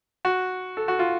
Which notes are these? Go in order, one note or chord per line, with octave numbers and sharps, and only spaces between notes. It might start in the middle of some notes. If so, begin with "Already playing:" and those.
F#4
A4
F#4
F4